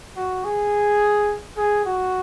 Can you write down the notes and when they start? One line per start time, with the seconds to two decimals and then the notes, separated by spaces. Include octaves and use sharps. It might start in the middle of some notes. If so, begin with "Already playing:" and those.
0.17 F#4
0.44 G#4
1.57 G#4
1.85 F#4